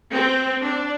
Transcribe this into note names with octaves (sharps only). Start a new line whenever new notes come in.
C4
D4